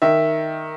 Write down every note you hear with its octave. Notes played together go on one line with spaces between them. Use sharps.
D#3 E5